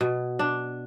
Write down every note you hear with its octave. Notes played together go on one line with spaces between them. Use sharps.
B2
D4